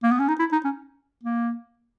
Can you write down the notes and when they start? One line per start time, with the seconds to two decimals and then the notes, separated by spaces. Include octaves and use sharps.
0.03 A#3
0.11 B3
0.19 C#4
0.28 D#4
0.39 E4
0.52 D#4
0.64 C#4
1.23 A#3